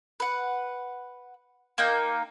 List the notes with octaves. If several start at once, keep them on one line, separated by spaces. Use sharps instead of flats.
B4 F#5
A#3 D#4 G5